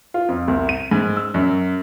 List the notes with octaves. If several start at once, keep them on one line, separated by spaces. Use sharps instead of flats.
F4
F2
C2
D#7
G#2
E6
F#2